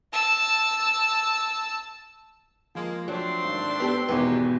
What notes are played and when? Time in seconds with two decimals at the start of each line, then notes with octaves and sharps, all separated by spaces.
0.13 A5 E6
2.75 F3 G#3 A#3
3.08 F#3 A3 C4 D4 C6
3.44 G#1
3.80 B3 G4 A4
4.09 G#1 E2 B2 F#3 G#3 B3 G4 B4